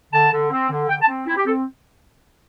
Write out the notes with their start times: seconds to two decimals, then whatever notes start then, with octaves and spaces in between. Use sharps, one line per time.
0.13 D3 A5
0.32 D3
0.51 C4
0.70 D3
0.89 D3 G5
1.02 A5
1.08 C4
1.27 C4 E4
1.37 G4
1.46 C4 A4